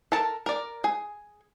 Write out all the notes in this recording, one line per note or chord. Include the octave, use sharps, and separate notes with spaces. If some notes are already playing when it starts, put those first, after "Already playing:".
A4 A#4 A5
A#4 D5
G#4